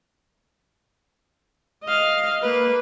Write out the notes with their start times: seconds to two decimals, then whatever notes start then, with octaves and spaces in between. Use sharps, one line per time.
1.84 D#5 F5
2.42 A#3 B4